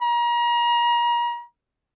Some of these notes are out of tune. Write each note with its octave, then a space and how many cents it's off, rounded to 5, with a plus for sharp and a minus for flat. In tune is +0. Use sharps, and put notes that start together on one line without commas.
A#5 +35